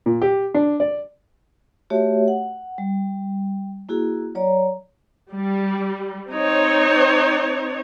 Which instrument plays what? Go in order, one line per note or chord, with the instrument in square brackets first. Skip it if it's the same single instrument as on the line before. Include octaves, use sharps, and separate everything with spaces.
[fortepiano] A#2
G4
D4
D5
[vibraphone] A3 F#4 G4 C#5 E5
F#5
G3
A#3 E4 F#4 G#4
F#3 C#5 D5 A#5
[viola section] G3
C4 D#4 C#5